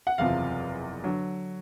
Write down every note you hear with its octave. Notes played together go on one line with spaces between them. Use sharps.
F#5
F#1 E2 C3 F3 F5
D3 F#3